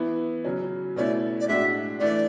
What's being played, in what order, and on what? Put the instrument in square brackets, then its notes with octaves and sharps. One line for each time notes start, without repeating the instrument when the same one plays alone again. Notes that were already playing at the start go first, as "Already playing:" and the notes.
Already playing: [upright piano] E3 B3 E4
C#3 F#3 C#4
[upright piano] B2 A3 C#4 E4 [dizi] D5
[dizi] D5
[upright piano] A2 G#3 D4 F#4 [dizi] E5
[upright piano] E3 A3 D4 [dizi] D5